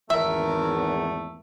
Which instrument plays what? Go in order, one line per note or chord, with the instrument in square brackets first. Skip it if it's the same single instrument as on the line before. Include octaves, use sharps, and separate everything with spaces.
[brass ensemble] G#1 E2 [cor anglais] A3 [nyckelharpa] A#4 [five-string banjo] E5